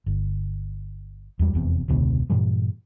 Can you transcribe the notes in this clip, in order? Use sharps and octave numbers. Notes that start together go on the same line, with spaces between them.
G1
E2 G3
F1 E2 C3
E1 C#2 B2 D3
G2 A#2 E3 G3